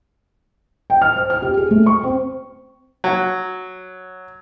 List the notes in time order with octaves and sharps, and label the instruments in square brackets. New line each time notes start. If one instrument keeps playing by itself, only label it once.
[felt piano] G5
F6
C5
F6
G4
G#4
A3
C#6
C4
[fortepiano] F#3